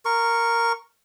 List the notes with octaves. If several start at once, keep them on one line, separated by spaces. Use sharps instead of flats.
A#4 C#6